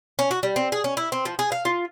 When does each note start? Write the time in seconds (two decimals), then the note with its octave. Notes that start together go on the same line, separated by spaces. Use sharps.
0.19 C#4
0.31 F#4
0.43 G3
0.56 C4
0.72 G#4
0.84 C#4
0.97 E4
1.12 C4
1.25 F3
1.39 G#4
1.52 F5
1.65 F4